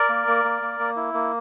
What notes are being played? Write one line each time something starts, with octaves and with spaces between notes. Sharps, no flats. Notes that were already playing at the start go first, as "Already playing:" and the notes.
Already playing: A#4 D5
A#3
A#3
A#3
A#3
A#3
E4
A#3